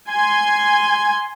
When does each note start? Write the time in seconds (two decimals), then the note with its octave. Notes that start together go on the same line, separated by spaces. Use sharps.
0.10 G#5 C6